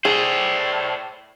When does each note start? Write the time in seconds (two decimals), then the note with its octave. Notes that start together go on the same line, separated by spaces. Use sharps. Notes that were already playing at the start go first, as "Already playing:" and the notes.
0.05 A2 G#4 C5 D5